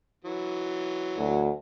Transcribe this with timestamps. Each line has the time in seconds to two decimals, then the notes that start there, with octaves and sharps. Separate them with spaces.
0.25 E3 F#3
1.17 D2